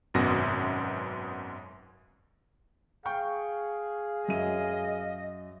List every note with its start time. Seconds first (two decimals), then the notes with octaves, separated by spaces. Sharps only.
0.14 G#1 F#2 B2 A#6
3.06 G#4 F5 G5 C#6 G6
4.28 F#2 D#5 E5 D#7